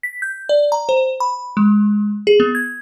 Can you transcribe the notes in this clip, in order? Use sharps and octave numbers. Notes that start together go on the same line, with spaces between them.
B6
G6
D5
A#5
C5
B5
G#3
G#4
B3
G#6